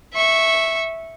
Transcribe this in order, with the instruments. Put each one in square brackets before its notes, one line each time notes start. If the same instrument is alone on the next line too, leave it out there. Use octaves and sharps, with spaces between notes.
[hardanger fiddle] E5 C#6